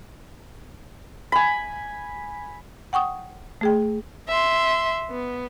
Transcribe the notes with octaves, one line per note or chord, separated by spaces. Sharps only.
G#5 B5
F#5 G5 C#6 D#6
A3 G#4 G5
E5 C6
B3